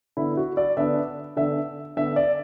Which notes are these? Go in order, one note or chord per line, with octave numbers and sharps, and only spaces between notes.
D3 B3 D4 E4
F#4
D5
D3 B3 D4 E5
D3 B3 D4 E5
D3 B3 D4 E5
D5